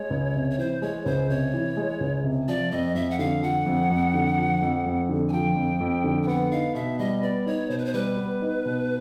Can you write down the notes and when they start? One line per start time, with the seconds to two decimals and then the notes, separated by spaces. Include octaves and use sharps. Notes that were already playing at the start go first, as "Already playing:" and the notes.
Already playing: G#3 C#5
0.10 C#2
0.34 C3
0.51 C#5
0.58 E3 C5
0.82 G#3 C#5
1.06 C#2 C5
1.29 C3 C#5
1.54 E3
1.77 G#3
2.00 C#2
2.24 C3
2.48 F3 D5
2.71 F2 D#5
2.95 F2 E5
3.10 F#5
3.19 D3 F5
3.43 F3 F#5
3.66 F2
3.90 F2
4.14 D3
4.38 F3
4.62 F2
4.86 F2
5.09 D3
5.29 G#5
5.32 F3 G5
5.56 F2
5.81 F2
6.04 D3
6.22 G5
6.27 B3 F#5
6.51 D#4 F5
6.75 B2 E5
6.99 G3 D#5
7.23 B3 D5
7.46 D#4 C#5
7.69 B2 C5
7.78 B4
7.85 C5
7.94 G3 B4
8.18 B3
8.42 D#4
8.65 B2